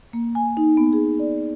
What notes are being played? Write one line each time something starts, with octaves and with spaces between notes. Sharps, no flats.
A#3
G#5
D#4
B3
G#4
D5